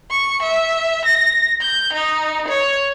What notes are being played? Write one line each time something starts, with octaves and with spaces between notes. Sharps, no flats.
C#6
E5
A#6
G6
D#4
C#5